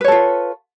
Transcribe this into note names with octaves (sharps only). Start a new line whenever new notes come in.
F4 A4 B4 C#5